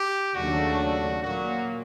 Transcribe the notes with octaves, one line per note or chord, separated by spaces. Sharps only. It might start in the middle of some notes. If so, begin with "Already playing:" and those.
Already playing: G4
D#2 C#3 F#3 A3 D4 F#4
A#2 F#3 A#3 F#4